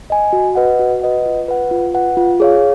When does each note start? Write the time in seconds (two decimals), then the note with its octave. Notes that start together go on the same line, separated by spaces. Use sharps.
0.10 D#5 G#5
0.33 F#4
0.55 B4 D#5 F#5
0.79 F#4
1.02 B4 D#5 F#5
1.26 F4
1.48 B4 F#5
1.71 F4
1.94 B4 F#5
2.17 F4
2.40 G#4 C#5 F5